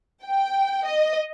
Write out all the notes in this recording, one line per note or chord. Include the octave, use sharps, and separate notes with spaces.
G5
D#5